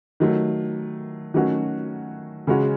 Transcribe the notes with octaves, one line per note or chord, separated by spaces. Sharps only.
D#3 F#3 A3
D#3 F#3 A3 C#4 F#4
C#3 G#3 C#4 F#4